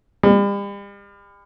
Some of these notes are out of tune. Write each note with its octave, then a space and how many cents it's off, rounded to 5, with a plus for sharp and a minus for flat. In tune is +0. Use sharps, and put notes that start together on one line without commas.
G3 +40